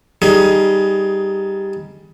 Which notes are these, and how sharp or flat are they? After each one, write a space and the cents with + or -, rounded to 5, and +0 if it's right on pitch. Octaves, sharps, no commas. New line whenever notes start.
G3 +0 D#4 +0 G#4 +15